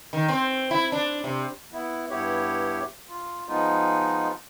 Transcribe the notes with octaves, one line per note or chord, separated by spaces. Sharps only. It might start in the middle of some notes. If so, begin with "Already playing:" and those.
D#3
C4
E4
D4
C3
B3 E4
G2 B3 E4 G4 C#5
F4
F3 G#3 B3 D#4 F4